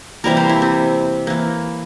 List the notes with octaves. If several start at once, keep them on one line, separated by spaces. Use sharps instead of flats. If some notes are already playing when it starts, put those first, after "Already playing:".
C3 E3 G3 A#3 A#4
C5
E4
C4
E3 A#3